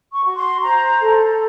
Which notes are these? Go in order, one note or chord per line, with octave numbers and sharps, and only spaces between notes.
C#6
F#4
C6
C5 A#5
A4